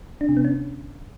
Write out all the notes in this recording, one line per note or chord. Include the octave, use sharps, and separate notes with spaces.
D4
C3
B3
C#4